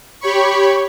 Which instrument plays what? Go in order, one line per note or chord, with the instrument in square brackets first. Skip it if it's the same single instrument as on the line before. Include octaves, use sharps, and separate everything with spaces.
[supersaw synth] G4 C#5 B5 C#6